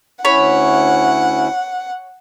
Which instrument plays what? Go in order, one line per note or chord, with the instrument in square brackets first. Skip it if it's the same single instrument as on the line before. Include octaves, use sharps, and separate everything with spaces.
[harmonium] D2 C#4 E4 [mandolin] C#5 B5 [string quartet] F#5